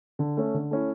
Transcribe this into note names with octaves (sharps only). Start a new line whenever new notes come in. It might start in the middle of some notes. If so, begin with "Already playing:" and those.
D3
A3 C#4
D3
A3 C#4 E4